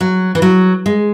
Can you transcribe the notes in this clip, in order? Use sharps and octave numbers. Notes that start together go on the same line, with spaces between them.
F#3
E3
F#3
G#3